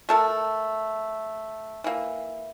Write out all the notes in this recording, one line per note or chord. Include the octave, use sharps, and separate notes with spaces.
A3 A4 A#4
E3 A#3